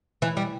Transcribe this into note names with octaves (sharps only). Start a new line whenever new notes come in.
E3
G3